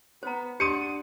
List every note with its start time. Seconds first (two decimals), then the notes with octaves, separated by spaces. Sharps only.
0.23 B3 C5 A#5
0.60 D4 G4 F#5 C6 D#6 C#7 D#7